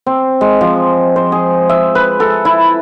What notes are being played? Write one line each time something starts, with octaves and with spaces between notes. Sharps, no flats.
C4
G#3
F3
C5
G#4
E5
B4
A4
E4